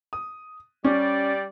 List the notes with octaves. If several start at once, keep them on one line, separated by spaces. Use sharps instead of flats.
D#6
G3 C#4 D5